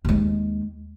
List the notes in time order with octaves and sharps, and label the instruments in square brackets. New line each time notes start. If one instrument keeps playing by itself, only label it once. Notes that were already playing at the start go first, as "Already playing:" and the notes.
[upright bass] D#2 G#3